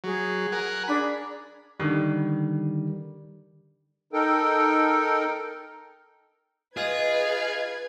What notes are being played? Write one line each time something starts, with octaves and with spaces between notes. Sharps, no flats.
F#3 G#4
A#4 F#5 G#5
D4 G#4 D5 B5
D3 D#3 G3
D#4 A4 A#4 G5
F4 G#4 B4 D#5 G#6